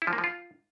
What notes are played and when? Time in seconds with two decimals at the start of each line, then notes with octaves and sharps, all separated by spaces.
0.02 E4
0.07 F3
0.13 A#3
0.18 F3
0.24 F4